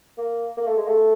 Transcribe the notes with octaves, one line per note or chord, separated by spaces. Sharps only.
A#3
A#3
A3
G#3
A3